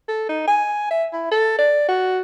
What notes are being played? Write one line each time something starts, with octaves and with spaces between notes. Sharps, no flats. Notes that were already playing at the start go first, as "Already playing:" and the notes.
A4
D#4
G#5
E5
E4
A4
D5
F#4